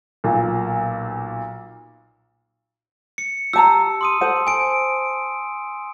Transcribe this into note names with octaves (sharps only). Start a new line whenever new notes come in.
B1 A#2
C#7
G4 A5 A#5 E6
C6 D#6 D#7
A4 C5 F#5
G#5 D7